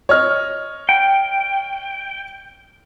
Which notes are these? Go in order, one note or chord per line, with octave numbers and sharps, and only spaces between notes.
C#5 D#5 F6
G5